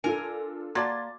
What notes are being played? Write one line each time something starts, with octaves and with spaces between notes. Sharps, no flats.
D4 F4 A4 A#4 G#5
A#3 F#4 D5 A5 A#5 C6 A6